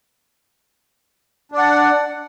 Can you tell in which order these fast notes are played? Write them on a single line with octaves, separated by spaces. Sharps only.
D4 D5 F#5